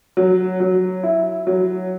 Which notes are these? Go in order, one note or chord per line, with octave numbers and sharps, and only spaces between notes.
F#3
F#3
E4
F#3